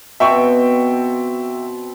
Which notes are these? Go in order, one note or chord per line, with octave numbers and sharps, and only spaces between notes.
B2 C4 E5 G5 C#6